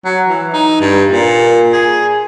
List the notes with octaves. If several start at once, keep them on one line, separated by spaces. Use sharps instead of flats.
F#3
E3
D#4
G2
A#2
G#4